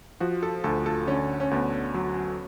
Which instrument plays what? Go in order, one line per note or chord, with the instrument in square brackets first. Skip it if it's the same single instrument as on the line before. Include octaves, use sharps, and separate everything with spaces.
[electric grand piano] F3 [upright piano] F#4
[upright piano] A4
[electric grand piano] D2 [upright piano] A4
[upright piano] A4
[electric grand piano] D3 [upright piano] C#4
[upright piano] C#4
[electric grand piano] D2 [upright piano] B3
[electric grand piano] F#3